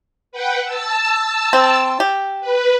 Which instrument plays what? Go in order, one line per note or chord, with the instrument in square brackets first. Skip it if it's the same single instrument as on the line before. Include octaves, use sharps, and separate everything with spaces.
[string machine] B4 F#5 G5
A5 E6
[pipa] C4
G4
[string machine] B4